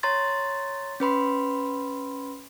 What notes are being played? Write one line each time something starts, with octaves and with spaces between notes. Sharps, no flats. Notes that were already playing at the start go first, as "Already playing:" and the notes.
C#5 A#5 C6 A6
C#4 B4 B5 C6